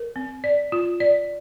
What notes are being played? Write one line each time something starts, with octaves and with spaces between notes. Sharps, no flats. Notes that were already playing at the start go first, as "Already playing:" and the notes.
Already playing: A#4
C4
D5
F4
D5